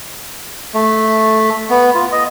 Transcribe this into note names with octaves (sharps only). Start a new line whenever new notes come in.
A3
B3
F4
D#5